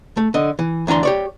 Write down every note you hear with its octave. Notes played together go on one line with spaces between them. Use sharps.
A3
D3 D#5
E3
D2 E3 D4 A#5 C6
G4 C#5 D5